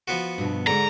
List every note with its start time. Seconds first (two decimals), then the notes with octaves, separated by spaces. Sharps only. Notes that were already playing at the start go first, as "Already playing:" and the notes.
0.08 F3 B3 F#4
0.38 G2 B2
0.67 G#2 D3 A#5